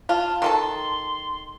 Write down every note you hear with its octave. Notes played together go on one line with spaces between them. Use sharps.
F4 A5
D#3 A4 A5 C6